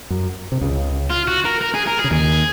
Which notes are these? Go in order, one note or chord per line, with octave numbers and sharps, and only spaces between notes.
F#2
C3
C#2 C#3
F4
F#4
A#4
A#4
G#4
A#4
G#4
C#3
D#2 D#3 G#4